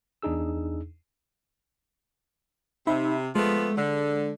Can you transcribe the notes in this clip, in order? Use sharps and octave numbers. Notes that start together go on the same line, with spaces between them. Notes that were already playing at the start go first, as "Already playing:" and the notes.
E2 D4 D#4 G#4 E6
C3 D#4 E5 B5
F3 G#3 A3 B3
D3